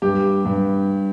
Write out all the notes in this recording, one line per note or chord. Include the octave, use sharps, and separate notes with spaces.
G2 G4
G2